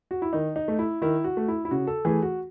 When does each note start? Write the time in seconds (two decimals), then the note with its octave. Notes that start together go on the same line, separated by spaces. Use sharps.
0.11 F#4
0.22 E4
0.33 D#3 D#4
0.56 D#4
0.68 A3
0.79 E4
1.02 D#3 E4
1.24 F#4
1.37 A3
1.48 E4
1.65 E4
1.71 C#3 F#4
1.87 A4
2.05 E3 A3 G#4
2.22 F#4